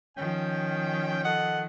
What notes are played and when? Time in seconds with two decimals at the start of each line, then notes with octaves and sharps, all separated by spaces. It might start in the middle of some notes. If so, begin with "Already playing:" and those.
0.17 D#3 F3 C#4 G5
1.25 A4 D#5 F#5